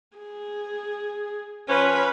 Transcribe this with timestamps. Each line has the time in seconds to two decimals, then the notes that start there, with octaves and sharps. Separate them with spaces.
0.17 G#4
1.69 F3 C#4 B4